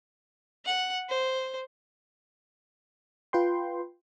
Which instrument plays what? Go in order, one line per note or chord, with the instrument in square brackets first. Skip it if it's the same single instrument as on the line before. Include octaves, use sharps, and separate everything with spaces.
[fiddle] F#5
C5
[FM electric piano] F4 B4 G5 C6